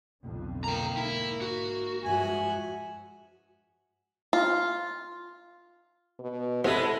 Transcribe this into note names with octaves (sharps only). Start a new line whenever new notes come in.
B1 F2 D3
A#3 G5 A#5
G#2 E4
F#4
G2 F3 G#3 E5 F#5 G#5
F4
B2
C3 G#3 B3 E4 A4 B4